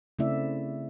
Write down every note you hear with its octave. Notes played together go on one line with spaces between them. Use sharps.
C#3 A3 C4 E4 D5 E5